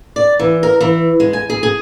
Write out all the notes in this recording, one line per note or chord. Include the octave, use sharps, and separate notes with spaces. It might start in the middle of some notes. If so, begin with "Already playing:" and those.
D5
E3
A#4
E3
G#3
G#5
G#4
G#4